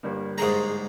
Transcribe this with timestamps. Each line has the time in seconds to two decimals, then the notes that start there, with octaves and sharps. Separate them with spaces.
0.03 G1 G3 A#3
0.38 G#2 G#4 A#5